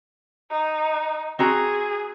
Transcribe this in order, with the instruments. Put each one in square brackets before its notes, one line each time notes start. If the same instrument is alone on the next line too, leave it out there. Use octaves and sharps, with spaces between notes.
[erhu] D#4
[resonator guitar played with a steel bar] C4 F#4 A#5 [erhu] G#4